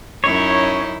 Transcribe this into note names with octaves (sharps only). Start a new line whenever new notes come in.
F#2 C#4 D#4 E4 C#5